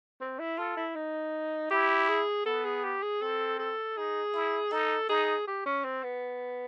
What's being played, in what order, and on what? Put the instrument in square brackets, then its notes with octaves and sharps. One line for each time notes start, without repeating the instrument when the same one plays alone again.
[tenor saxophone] C4
E4
[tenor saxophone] F4 [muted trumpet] A4
[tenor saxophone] E4
D#4
[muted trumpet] E4 [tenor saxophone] G4
[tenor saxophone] G#4
[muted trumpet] B3 [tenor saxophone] A4
[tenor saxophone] G#4
G4
G#4
[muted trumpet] C4 [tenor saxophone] A4
[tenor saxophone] A4
[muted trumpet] D#4 [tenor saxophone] G#4
[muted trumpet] E4
[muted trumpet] D#4 [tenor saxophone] A4
[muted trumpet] D#4 [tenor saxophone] G#4
[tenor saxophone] G4
C#4
C4
B3